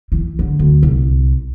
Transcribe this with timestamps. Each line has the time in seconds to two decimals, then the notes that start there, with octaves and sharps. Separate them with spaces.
0.12 E3
0.39 D3
0.59 D2
0.83 C2